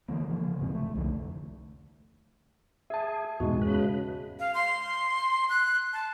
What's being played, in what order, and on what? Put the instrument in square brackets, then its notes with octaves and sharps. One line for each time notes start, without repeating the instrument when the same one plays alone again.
[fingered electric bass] D3 E3 A#3
C#3 F3
D#1 G#2 C3 E3
A3
C2 F2 D3 D#3
[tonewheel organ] G#4 [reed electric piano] E5 A5
[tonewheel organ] E2 G#2 B2 [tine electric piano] G#3 F#4
[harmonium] C#3 [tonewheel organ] B4
[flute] F5
C6
F#6
A5